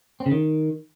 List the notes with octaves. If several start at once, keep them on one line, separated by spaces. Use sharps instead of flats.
C4
C#3
D#3